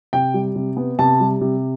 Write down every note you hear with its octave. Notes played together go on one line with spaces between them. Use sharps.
C3 G5
G3
C3
B3
C3 A5
G3
C3